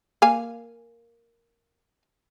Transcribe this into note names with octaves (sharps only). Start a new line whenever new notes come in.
A#3 F5 G#5